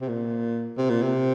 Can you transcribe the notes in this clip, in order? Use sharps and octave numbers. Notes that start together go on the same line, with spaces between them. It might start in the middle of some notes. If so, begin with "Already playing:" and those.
C3
A#2
C3
A#2
C3